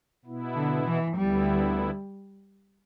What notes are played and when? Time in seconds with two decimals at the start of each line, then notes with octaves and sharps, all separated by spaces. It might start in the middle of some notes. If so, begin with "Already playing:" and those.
0.25 B2 B3 E4
0.55 D3
0.86 E3
1.16 D2 D3 G3 B3 E4